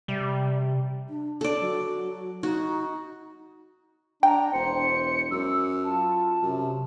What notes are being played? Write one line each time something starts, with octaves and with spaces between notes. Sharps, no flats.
C3 G3
D4
D4 A4 D5
F#3
D#4 F#4
D4 G5 A#5
E1 C5 C#7
F#2 E6
F4 A5
F#2 C3